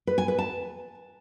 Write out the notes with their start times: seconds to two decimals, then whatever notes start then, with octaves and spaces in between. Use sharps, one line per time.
0.07 B4
0.18 G#5
0.28 B4
0.39 A5